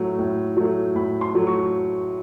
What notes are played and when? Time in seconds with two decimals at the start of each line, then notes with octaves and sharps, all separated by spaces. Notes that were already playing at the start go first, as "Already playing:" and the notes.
Already playing: A2 F#3 A3
0.19 A2
0.57 F#3 A3
0.95 A2 B5
1.21 C6
1.34 F#3 A3
1.47 C#6